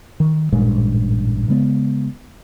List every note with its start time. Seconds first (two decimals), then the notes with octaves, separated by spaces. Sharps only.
0.20 D#3
0.53 A1 G2 A#2 G#3
1.49 C#3 G#3 B3